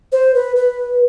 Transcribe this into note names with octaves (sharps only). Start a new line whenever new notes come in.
C5
B4
B4